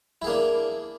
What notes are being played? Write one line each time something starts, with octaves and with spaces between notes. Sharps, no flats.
A#3 D4 E4 G#4